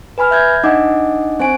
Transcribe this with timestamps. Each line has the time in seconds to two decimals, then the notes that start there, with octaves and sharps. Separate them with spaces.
0.18 B4 G#5 B5 F6
0.31 E5 G6 G#6
0.64 D4 D#4 D#5 F#5 D6
1.40 C4 C5 G#5 D7